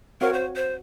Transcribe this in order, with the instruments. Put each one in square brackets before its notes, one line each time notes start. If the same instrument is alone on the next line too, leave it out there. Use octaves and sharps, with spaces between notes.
[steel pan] C4 F#4 C#5 F5 [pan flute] A#4
[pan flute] C5
C5